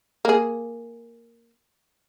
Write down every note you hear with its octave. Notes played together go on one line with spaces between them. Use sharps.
A#3 G#4